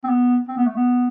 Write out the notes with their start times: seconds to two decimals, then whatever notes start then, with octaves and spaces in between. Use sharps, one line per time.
0.04 C4
0.09 B3
0.48 C4
0.57 B3
0.67 A3
0.76 B3